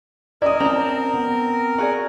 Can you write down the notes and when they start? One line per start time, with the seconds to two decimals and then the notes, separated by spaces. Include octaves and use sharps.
0.42 E4 A#4 D5 D#5 D#6
0.60 C4 C#4 A5 A#5
1.14 B3
1.78 F#4 G#4 D5